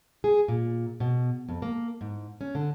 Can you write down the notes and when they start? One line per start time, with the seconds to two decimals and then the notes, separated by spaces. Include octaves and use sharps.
0.24 G#4
0.48 A#2
1.00 B2
1.49 F2
1.62 A#3
2.01 G#2
2.41 C#4
2.55 D3